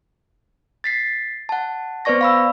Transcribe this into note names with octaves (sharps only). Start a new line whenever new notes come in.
A6 B6 C7
F#5 A5
B3 B4 C5 D5 C#6 A#6
F5 B5 E6